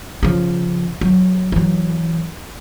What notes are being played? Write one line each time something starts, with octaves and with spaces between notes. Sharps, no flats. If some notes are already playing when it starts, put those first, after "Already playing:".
C#3 F3
F#3
E3 F#3